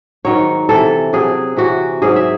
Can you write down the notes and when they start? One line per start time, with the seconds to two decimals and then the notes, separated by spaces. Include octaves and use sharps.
0.25 G#2 D#3 F#3 C#5
0.69 C3 E3 A4
1.13 C3 F#3 G#4
1.57 C3 E3 F#4
2.02 G#2 F#3 G#4
2.16 E5